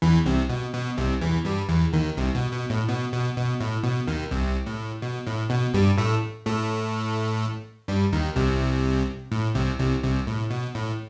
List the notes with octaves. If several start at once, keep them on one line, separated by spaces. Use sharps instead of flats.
E2 E3
C2 C3
B2
B2
C2 C3
E2 E3
G2 G3
E2 E3
D#2 D#3
C2 C3
B2
B2
A2
B2
B2
B2
A2
B2
D#2 D#3
C2 C3
A2
B2
A2
B2
G2 G3
A2 A3
A2 A3
G2 G3
D#2 D#3
C2 C3
A2
C2 C3
C2 C3
C2 C3
A2
B2
A2